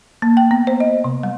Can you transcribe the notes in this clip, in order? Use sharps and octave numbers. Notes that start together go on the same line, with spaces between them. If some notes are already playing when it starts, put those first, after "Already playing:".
A#3
G5
B3
C5
D#5
C3
G3